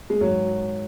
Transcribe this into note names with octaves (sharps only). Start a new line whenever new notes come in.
G#3
G#1 F#3